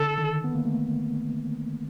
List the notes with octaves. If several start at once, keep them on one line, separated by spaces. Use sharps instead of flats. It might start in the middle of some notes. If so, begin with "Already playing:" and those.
Already playing: D3 A4
D#3
B3
A#3
A3